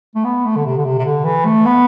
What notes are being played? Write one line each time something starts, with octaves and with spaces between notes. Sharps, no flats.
A3
B3
A3
D3
C3
D3
C3
C3
D3
E3
A3
B3